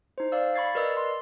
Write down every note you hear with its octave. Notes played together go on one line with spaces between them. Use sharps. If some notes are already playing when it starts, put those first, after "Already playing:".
D#4 C5
D5 F5 E6
B5 C#6 G#6 A6 C7
A#4 B4 D5 D#5 E6
C6